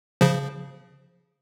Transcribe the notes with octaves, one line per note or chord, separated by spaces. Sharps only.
C#3 F3